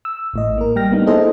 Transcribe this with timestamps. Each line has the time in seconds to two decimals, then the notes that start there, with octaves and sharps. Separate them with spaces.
0.05 E6
0.34 A1 A2 D#5
0.58 A#3 A#4
0.76 G3 G5 F6 A#6
0.91 G3 A#3 B3 D4 D#4
1.06 D#4 E4 G#4 A4 C5 D#5